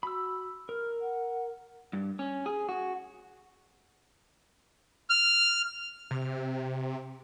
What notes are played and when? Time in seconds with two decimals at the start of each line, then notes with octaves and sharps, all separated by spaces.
0.03 F#4 B5 E6
0.69 A#4 F6
1.01 F#5
1.93 G2
2.19 C#4
2.46 G#4
2.69 F#4
5.10 F6
6.11 C3